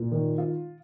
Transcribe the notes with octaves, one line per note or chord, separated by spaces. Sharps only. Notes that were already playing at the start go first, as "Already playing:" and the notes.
Already playing: A#2
D#3
F4